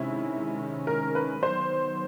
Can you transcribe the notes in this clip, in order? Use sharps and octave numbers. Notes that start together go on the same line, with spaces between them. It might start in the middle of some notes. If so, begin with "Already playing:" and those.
Already playing: C3 D#3 G#3 C#4 E4
A#4
B4
D#3 F#3 B3 C5